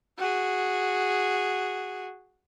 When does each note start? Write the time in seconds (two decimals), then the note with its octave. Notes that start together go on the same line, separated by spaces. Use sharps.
0.18 F#4 G#4